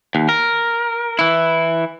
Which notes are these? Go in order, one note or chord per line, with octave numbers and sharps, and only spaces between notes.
D#2
A#4
E3 E4